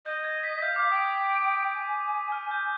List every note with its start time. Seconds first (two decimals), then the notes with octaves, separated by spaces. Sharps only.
0.06 D#5 G6
0.24 G#6
0.43 B6
0.62 F5 G6
0.76 D6
0.90 G5 D#6
1.05 D#6
1.75 G#5
2.32 F6
2.51 G6